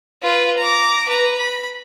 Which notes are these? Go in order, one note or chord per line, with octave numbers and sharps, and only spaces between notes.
F4 B4
A#5 D6
B4 A#5
B5